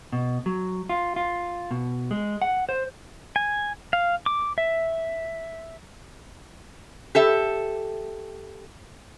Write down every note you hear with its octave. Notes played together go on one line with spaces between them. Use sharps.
B2
F#3
F4
F4
B2
G#3
F#5
C5
G#5
F5
D6
E5
G4 A4 E5